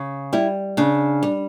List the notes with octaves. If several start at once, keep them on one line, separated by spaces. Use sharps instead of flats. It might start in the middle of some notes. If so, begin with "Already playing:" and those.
Already playing: C#3
G3 E4
C#3 D4
G3